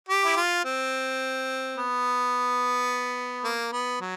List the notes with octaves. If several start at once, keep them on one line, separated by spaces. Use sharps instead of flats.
G4
E4
F4
C4
B3
A#3
B3
F#3